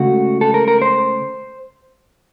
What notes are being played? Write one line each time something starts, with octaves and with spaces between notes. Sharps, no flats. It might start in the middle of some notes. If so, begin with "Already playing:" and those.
Already playing: C#2 C#3 A3 F#4
A4
A#4
A#4
C5